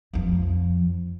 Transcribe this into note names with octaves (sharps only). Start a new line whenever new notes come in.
F2 F3